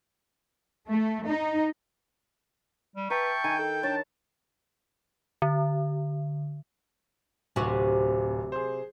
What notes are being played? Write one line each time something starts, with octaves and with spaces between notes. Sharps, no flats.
A3
D#4
G3
B4 E5 G5 A5 A#5 C#6
D#3 G#5
A4
D4 C#5 A5
D3
D1 C3 F#4
G#4 C5